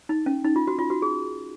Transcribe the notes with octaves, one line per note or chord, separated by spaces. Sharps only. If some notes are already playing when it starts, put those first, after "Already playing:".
D#4
C#4
D#4
F4
F#4
F4
F#4
G#4